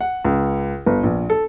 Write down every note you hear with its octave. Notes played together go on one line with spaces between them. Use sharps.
F#5
C#2
G1
A#1
A4